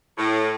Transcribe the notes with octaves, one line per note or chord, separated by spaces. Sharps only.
A2